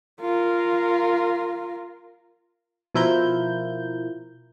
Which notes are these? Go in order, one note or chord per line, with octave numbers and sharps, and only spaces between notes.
F4 A#4
B2 F3 E4 F4 A#4 G6